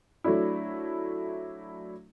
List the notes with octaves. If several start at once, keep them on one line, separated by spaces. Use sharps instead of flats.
F#3 A3 D4 E4